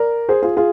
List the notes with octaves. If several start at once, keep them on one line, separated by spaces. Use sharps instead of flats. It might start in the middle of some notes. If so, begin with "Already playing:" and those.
Already playing: A#4 D5
G#4 C5
F4 G#4
F4 G#4